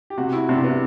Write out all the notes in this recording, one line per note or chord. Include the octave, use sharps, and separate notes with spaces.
G4
C3 F#4
E4
C3 D4
B3